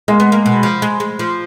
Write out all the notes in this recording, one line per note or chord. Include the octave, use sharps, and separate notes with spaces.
G#3 A#3
B3
A#3
B2
F3
G#3
G#3
F3